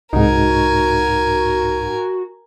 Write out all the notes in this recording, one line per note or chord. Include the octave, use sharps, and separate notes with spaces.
C2 G#2 D#4 F#4 A#4 G#5